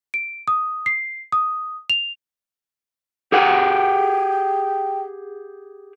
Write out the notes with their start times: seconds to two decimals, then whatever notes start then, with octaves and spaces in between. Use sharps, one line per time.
0.14 D7
0.48 D#6
0.86 C7
1.32 D#6
1.90 F7
3.32 G4 G#4 F#5 G5